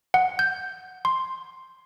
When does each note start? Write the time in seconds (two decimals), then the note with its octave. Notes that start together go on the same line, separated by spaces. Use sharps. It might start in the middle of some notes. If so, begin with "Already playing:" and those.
0.14 F#5
0.39 G6
1.05 C6